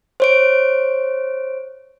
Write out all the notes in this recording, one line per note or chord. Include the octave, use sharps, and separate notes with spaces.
C5 C#5 D7